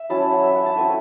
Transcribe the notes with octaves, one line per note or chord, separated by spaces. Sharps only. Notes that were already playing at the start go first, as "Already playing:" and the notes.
Already playing: E5
F#3 C#4 E4 A5
F#5
E5
F#5
A5
A3 C4 E4 G#5